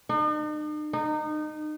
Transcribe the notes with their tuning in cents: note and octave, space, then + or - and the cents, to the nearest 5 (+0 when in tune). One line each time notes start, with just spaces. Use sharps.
D#4 -45
D#4 -25